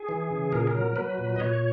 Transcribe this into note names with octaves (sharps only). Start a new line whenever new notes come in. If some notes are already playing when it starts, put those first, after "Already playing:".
Already playing: G#4
E3
C#3
A#2 A#4
G#4
A#4
F#3
F#3 B4
A#2
D#5
A#2 C#5